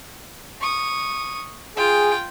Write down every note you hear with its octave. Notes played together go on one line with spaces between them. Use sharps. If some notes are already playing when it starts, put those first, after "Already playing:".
C#6 D#6
F4 G#4 G5